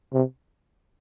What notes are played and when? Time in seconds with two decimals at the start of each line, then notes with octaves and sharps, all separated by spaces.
0.13 C3